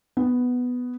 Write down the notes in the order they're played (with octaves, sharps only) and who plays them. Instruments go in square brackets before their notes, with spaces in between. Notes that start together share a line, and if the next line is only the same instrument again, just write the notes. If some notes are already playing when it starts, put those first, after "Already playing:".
[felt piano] B3